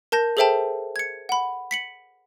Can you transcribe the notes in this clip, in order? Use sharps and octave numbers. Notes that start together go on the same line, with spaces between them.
A#4 A5 G6 A#6
G#4 A4 C5 E5 G5 A5
G#6 C#7
F#5 B5
B6 C#7 F#7